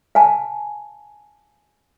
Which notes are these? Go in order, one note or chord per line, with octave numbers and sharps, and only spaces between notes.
F5 G#5 A5